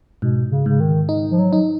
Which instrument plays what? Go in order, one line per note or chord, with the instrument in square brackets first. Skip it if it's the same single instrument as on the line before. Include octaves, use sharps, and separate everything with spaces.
[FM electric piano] G#2 [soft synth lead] B2
[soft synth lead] C#3
[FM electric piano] G#2 [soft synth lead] C#3
[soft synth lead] D#3
[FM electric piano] D#4
[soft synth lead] F3
F#3
[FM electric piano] D#4